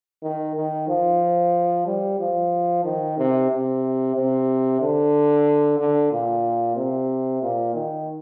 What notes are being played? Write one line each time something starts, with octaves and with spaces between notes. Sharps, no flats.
D#3
D#3
F3
G3
F3
D#3
C3
C3
C3
D3
D3
A#2
C3
A#2
D#3